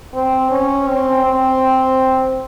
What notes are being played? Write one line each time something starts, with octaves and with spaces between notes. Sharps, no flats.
C4
C#4
C4
C4